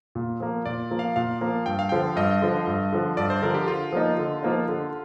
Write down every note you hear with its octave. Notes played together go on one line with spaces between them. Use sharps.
A#2
F3 A#3
A#2 D5
F3 A#3
F5
A#2 F5
F3 A#3
G2 G5
F5
D3 F3 G5
G2 D#5
D3 F3
G2
D3 F3
G2 D5
C5
D3 F3 A#4
G4
D3 F4
F3 A#3 D#4
D3
F3 A#3 D#4
D3